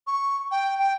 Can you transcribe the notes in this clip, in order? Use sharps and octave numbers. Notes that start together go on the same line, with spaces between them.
C#6
G5
G5